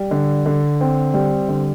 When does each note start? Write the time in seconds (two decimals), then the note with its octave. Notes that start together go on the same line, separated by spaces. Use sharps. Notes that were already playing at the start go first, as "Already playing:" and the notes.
Already playing: G3
0.11 D3
0.46 D3
0.81 C4
1.14 G3
1.49 D3